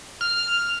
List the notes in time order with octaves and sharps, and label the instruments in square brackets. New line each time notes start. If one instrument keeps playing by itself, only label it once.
[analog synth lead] F6